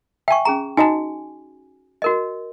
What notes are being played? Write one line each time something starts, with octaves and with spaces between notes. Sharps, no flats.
E5 G5 G#5 C#6
C#4 G#4 A#5
D#4 F#4 D#5 G#5 A5
F#4 A#4 D#5